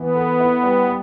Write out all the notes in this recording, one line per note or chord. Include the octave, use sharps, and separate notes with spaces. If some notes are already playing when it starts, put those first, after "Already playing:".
Already playing: E3 B3
A4
E4
G3
G3